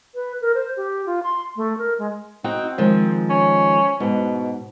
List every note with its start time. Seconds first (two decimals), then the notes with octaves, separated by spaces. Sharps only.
0.15 B4
0.41 A#4
0.55 C5
0.77 G4
1.06 F4
1.23 C6
1.56 A3
1.78 A#4
1.99 G#3
2.44 C4 D#4 F#4 G5
2.78 D#3 F3 G#3
3.30 C#4
4.00 G#2 B2